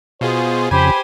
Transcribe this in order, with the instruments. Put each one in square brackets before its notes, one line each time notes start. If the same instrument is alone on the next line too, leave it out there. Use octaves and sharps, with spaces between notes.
[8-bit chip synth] B2 F4 G#4 [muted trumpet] C5
[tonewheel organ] F2 C#3 [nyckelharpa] G4 C5 [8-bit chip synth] G#5 [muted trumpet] B5